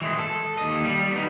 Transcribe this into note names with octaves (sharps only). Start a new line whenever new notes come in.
E3 G#3
A4
D#2 D#5
G3
B3 D#4